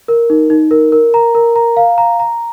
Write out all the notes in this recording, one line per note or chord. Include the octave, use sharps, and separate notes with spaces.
A#4
D#4
D#4
A#4
A#4
A#5
A#4
A#5
F5
A#5
A#5